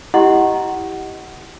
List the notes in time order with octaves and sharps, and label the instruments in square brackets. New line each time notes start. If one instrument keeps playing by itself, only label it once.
[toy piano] E4 G4 D#5 F#5 C6